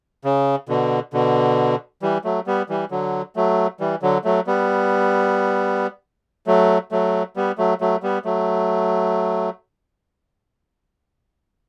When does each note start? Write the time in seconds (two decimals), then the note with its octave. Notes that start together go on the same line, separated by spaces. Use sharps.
0.24 C#3
0.68 B2 D3
1.13 B2 D3
2.02 E3 G3
2.24 F#3 A3
2.47 G3 B3
2.69 E3 G3
2.91 D3 F#3
3.36 F#3 A3
3.80 E3 G3
4.02 D3 F#3
4.24 F#3 A3
4.47 G3 B3
6.47 F#3 A3
6.91 F#3 A3
7.36 G3 B3
7.58 F#3 A3
7.81 F#3 A3
8.03 G3 B3
8.25 F#3 A3